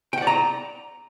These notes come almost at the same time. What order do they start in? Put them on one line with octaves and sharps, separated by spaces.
G5 F#5 D5 A#5